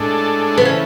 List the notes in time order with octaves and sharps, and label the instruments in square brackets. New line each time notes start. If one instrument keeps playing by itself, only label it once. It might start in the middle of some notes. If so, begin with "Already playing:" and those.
Already playing: [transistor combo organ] A2 G#3 D4 A4
[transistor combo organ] C#3 E3 A3 [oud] B3
[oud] C#4